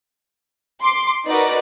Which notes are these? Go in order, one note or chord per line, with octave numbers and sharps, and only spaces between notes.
C6 D6
D#4 F#4 A#4 B4 D5